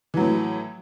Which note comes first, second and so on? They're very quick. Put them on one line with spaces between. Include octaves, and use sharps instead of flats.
E3 F#3 A2